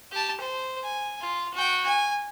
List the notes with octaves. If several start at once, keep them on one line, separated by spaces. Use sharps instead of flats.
G4 A5
C5
G#5
F4
F#4 G5
G#5